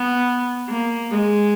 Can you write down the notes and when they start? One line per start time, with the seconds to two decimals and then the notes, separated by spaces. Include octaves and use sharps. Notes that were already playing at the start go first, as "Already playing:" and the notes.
Already playing: B3
0.70 A#3
1.11 G#3